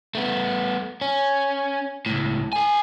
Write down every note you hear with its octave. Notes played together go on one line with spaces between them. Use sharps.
A3 B3
C#4
C#2 A2
A4 G#5